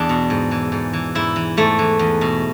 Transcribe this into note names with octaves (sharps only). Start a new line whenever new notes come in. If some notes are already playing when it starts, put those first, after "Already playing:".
Already playing: E2 D4
B2
G#2
E3
G#2
E3
G#2 E4
E3
G#2 A3
E3
E2
B2